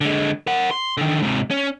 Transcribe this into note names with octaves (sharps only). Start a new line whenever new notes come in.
D3 G#3
A#4 F#5
C6
D3 D#3
G#2 C3
C#4